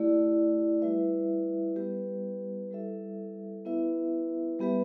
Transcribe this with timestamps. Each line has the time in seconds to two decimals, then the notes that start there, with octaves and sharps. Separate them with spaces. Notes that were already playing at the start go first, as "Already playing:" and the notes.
Already playing: A3 E4 G4 D5
0.82 G3 E4 B4 E5
1.76 G3 B3 G4 B4
2.71 G3 E4 A4 E5
3.65 B3 E4 B4 E5
4.60 G3 B3 G4 B4 E5